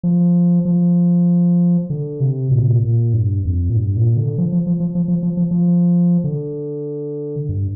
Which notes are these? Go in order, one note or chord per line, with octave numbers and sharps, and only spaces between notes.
F3
F3
D3
C3
A#2
C3
A#2
A#2
G2
F2
A#2
G2
A#2
D3
F3
F3
F3
F3
F3
F3
F3
F3
F3
D3
G2